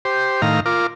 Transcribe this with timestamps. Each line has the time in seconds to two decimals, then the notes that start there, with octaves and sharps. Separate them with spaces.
0.05 G4 C5
0.42 A2 D#3 F5 A#5
0.66 F4 A#4 D6